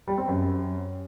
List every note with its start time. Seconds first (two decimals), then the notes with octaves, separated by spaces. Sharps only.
0.08 G3
0.18 C4
0.28 F#2